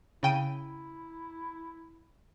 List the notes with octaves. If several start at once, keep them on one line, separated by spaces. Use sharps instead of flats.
C#3 E4 G5 D#7